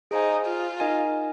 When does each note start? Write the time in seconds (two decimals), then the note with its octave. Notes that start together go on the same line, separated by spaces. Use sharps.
0.11 D#4 G#4 C5 F5 G#5
0.46 F4
0.80 D#4 A#4 D#5 G#5